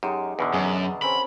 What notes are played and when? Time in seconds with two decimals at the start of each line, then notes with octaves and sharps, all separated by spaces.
0.03 F#2 G#3 D#4 G4
0.39 E2 B2 D3
0.54 F#2 G#4 A5
1.02 C4 C#4 A#4 B5